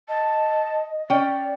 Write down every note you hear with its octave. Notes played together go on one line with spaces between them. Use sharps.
D#5 A5
C#4 D5 G5